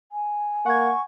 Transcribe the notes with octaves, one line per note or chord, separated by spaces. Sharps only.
G#5
A#3 F#5 C#6 G#6